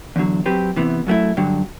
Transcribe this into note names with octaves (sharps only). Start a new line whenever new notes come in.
E2 D3 F#3
F#3 C4 G4 B4
C3 E3 B3
F#2 F#3 A3 E4
G2 D3 F#3